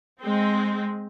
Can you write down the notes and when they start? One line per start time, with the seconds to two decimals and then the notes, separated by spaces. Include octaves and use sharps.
0.21 G#3 C4